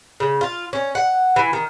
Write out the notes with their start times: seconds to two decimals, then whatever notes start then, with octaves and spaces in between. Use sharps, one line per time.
0.20 C#3
0.41 F4
0.73 C#4
0.95 F#5
1.36 E3
1.53 D#3